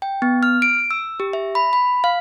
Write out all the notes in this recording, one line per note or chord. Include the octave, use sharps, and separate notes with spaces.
G5
B3
F6
D7
E6
G4
E5
B5
B5
F5